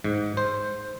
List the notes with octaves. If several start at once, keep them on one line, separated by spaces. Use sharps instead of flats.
G#2
C5